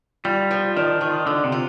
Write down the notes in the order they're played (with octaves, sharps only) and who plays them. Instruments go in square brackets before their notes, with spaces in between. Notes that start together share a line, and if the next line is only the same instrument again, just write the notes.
[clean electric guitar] G3 [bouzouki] F4
[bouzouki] F3
[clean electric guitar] D#3 [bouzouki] D4
[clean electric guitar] D#3 [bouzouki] F4
[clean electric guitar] D3 [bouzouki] F4
[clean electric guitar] C3
[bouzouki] F4